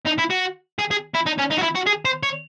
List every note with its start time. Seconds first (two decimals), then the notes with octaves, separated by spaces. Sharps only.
0.07 D#4
0.19 E4
0.31 F#4
0.79 G#4
0.91 G#4
1.15 E4
1.27 D#4
1.39 C#4
1.51 D#4
1.58 F#4
1.63 E4
1.75 F#4
1.87 G#4
2.05 C5
2.23 C#5